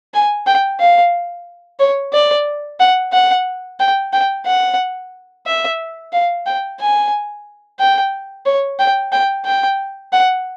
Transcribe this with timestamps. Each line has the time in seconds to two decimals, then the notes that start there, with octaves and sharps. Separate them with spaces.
0.14 G#5
0.47 G5
0.80 F5
1.80 C#5
2.13 D5
2.80 F#5
3.13 F#5
3.80 G5
4.13 G5
4.46 F#5
5.46 E5
6.13 F5
6.46 G5
6.80 G#5
7.80 G5
8.46 C#5
8.79 G5
9.12 G5
9.45 G5
10.13 F#5